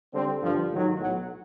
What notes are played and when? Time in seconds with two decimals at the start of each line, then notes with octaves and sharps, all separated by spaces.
0.13 D3 G3 C4
0.42 G2 D3 F3
0.70 A1 G#2 D#3 F#3
0.97 B1 A2 F#3